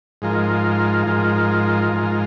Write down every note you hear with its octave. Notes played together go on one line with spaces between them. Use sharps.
G#2 F3 G#3 F4 A#4
G#2 F3 G#3 F4 A#4
G#2 F3 G#3 F4 A#4